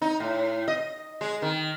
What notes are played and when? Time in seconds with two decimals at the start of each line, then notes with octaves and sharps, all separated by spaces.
0.02 D#4
0.20 A2
0.68 D#5
1.21 G#3
1.42 D#3